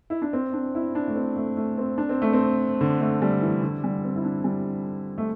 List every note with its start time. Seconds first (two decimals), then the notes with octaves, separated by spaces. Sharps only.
0.10 E4
0.22 D4
0.33 C4
0.53 D4
0.75 E4
0.95 D4
1.08 A3
1.16 C4
1.36 A3
1.57 A3
1.78 C4
1.98 D4
2.09 C4
2.22 A3
2.33 C4
2.81 D3
3.00 A3
3.22 G3
3.42 E3
3.63 D3
3.84 G3
4.04 C4
4.16 E4
4.24 D4
4.44 G3
5.18 A3